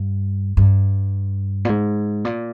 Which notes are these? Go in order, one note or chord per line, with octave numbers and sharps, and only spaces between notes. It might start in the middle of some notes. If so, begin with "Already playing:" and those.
Already playing: G2
G2
A#2
G#2
A#2